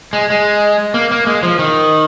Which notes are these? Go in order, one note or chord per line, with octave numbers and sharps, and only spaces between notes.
G#3
G#3
A#3
A#3
G#3
F3
D#3